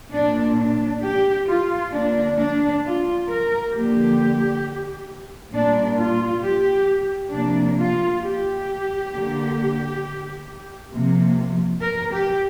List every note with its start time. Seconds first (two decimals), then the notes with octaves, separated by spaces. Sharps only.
0.13 A#2 A#3 D4
0.58 D4
1.03 G4
1.48 F4
1.93 D3 A#3 D4
2.38 D4
2.83 F4
3.28 A#4
3.73 D3 F3 A#3 G4
5.53 A#2 G3 A#3 D4
5.98 F4
6.43 G4
7.32 C3 F3 A#3 D4
7.78 F4
8.23 G4
9.12 D3 A#3
10.91 C3 F3 A#3
11.82 A#4
12.12 G4